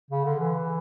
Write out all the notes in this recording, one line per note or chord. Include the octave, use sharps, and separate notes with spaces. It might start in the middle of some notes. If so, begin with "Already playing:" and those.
C#3
D3
E3